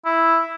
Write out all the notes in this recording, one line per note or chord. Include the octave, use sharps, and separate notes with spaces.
E4